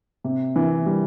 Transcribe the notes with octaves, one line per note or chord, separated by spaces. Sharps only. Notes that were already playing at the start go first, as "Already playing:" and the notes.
C3
E3
G3